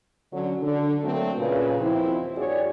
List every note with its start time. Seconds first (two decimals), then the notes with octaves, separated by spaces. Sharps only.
0.33 D3 F#3 C#4
0.61 D3
1.03 D3 F#3 A3 A#3 C4 D4
1.37 A#2 C#3 B4
1.81 D#2 F3 C4 E4
2.36 G2 F#4 G#4 C#5 D5